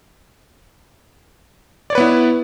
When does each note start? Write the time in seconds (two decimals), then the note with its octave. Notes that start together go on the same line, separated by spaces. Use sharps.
1.90 D5
1.93 C#5
1.95 B4
1.98 B3
2.00 E4